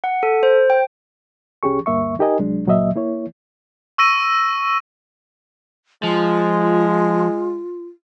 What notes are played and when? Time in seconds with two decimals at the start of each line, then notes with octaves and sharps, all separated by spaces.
0.04 F#5
0.23 A4
0.43 C5
0.70 G5
1.63 C2 C#4 G4 G#4 C#6
1.86 D2 G2 A#3 E5 C#6
2.19 D#4 G4 A#4 D#5 G#5
2.39 C2 F#3 G#3 D4
2.66 C#2 A#2 F#3 A#3 D#5 E5
2.95 A#3 E4 C#5
3.98 C#6 E6 A#6 D#7
6.03 F3 G#3 F4